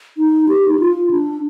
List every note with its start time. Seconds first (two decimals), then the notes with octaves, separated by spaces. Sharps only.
0.18 D#4
0.48 G4
0.68 D#4
0.79 F4
1.11 D4